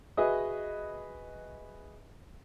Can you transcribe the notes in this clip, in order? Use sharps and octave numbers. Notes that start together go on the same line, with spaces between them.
F#4 G#4 B4 D#5 E5 D#6